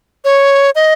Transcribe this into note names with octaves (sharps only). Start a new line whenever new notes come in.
C#5
D#5